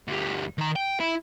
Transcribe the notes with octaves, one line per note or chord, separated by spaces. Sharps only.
D2 G3
D#3 A#5
G5
E4